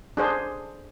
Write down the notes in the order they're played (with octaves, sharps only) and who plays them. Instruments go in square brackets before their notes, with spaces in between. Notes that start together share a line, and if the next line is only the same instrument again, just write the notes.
[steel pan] D4 G#4 C5